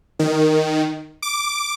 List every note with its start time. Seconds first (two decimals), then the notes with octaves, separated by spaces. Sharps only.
0.19 D#3
1.22 D6